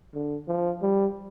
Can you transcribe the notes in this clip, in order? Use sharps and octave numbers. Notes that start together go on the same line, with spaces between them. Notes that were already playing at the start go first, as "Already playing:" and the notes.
D3
F3
G3